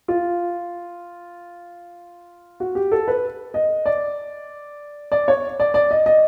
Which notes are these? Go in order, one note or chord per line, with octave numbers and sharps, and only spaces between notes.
F4
F#4
G4
A4
B4
D#5
D5
D5
C#5
D5
D5
D#5
D#5